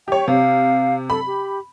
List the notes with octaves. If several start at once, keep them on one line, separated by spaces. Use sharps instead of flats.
G4 C#5 G5
C3 F5
A4 B5
G4